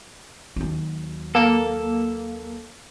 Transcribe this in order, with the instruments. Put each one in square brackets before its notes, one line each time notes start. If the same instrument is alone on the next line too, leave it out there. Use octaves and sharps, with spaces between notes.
[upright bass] D#2 F#3
[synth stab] A#3 [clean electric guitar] A4